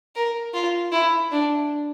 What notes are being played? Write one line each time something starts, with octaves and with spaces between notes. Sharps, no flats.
A#4
F4
E4
D4